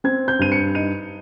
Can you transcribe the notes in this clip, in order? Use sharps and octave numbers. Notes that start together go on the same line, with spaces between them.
C4 G#6
G6
G2 D#7
C#7
D#4 D#7